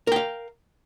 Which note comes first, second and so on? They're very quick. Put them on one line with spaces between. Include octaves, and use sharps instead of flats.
A#4 G5 F5